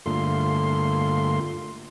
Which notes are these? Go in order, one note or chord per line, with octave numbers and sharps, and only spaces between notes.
G2 D3 A3 A#3 F4 C6